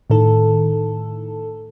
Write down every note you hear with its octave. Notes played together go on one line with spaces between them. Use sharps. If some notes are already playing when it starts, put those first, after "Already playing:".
A2 D#3 A4